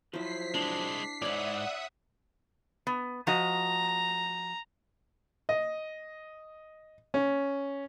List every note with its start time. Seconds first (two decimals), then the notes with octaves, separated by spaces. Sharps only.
0.13 F3 F#3 E4 C5 B6 C7
0.54 C2 G#3 D4
1.22 G#2 C#5 D5 E5 F#5 B5 D#6
2.87 B3
3.27 F3 F#4 D#5 A#5
5.49 D#5
7.14 C#4